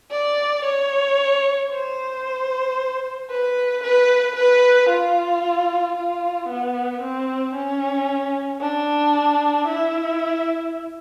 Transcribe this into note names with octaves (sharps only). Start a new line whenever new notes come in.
D5
C#5
C5
B4
B4
B4
F4
F4
B3
C4
C#4
D4
E4